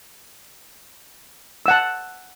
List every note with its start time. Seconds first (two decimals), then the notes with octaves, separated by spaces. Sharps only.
1.66 E6
1.68 F#5
1.71 A5